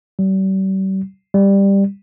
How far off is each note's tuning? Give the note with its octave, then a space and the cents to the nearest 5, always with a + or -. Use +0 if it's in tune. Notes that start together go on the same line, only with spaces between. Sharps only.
G3 -40
G3 +10